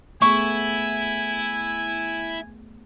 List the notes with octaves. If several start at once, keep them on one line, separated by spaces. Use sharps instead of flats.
A3 B3 E4 G#4 G#5 C#6